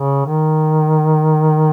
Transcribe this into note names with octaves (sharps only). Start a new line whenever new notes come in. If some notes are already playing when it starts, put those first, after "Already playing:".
Already playing: C#3
D#3